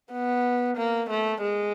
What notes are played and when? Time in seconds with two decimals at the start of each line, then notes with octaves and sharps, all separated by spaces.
0.12 B3
0.77 A#3
1.10 A3
1.42 G#3